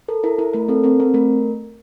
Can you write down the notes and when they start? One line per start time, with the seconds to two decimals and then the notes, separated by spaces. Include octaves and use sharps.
0.08 A4 A#4
0.24 E4 A#4
0.38 E4 A#4
0.54 A3 A#4
0.68 C4 A4
0.84 C4 A#4
1.00 C4 A#4
1.14 A3 A#4